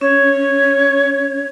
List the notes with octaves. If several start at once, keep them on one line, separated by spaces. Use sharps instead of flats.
C#4 C#5